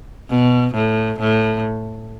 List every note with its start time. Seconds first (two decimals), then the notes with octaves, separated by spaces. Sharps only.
0.30 B2
0.74 A2
1.19 A2